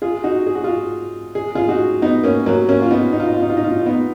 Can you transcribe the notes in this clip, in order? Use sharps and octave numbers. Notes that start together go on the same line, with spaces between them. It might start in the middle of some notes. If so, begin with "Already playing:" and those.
F4 G#4
D#4 F#4
G#4
F#4
F4 G#4
G#4
F4 G#4
D#4 F#4
B3 D#4
A#3 C#4
F#3 A#3
A#3 C#4
F4
B3 D#4
D#4
F4
D#4
F4
D#4
F4
D#4
F4
D#4
F4
B3 D#4